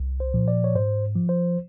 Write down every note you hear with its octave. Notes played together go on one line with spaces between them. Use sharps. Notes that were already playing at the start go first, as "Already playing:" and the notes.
Already playing: C2
C5
A#2 F3
D5
C#5
G#2 C5
F3
C5